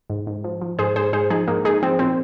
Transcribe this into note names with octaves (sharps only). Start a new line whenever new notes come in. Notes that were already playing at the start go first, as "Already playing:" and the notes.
G#2
G#2
F3
F3
G#2 G#4 C5
G#2 G#4 C5
G#2 G#4 C5
F3 D#4 G#4
G#2 A#3 D#4
G#2 D#4 G#4
F3 C4
A#2 C4